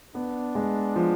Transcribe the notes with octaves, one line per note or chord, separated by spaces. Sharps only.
B3 D4
G#3
F3